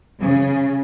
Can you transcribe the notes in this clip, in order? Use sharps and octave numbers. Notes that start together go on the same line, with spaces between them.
C#3